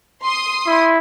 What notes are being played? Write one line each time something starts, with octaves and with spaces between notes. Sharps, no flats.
C6 D#6
E4